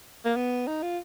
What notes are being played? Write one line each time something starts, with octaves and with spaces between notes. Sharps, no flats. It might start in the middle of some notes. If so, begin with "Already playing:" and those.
A#3
B3
D#4
F4